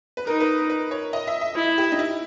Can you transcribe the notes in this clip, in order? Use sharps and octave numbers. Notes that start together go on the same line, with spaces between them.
B4
D#4 A#4
B4
B4
C#5
D#5
E5
E5
E4
G4
D#4
E4